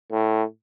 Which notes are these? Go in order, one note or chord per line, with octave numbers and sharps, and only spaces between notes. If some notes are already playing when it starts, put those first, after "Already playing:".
A2